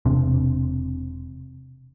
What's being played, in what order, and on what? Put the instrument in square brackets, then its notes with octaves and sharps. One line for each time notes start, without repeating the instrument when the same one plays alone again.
[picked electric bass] E1 C3 C4 D4